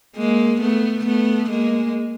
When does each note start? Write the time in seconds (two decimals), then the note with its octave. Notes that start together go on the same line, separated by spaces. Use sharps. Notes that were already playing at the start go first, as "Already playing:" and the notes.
0.16 G#3 A#3
0.61 A3 B3
1.06 A3 B3
1.50 G#3 A#3